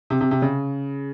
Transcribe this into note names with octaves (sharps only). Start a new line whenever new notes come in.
C3
C3
C3
C#3